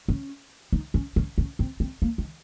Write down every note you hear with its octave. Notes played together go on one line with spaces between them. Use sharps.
C#4
D#4
C#4
C#4
C#4
C4
C4
A#3
D#3